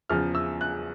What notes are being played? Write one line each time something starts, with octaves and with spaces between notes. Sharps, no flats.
E2 C#3 F3 F6
E6
F#6